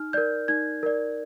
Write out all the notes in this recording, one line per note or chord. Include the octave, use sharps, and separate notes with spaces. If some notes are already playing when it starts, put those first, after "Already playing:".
Already playing: D#4 F6
A#4 D5 G6
D#4 G#6
A#4 D5